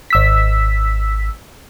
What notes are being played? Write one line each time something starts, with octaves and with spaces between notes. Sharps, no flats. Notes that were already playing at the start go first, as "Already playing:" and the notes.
G#1 E6 B6